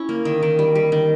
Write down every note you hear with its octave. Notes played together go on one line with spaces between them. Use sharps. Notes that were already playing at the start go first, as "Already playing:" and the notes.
Already playing: C#4 E4
A#3
D#3
D#3
G3
G3
D#3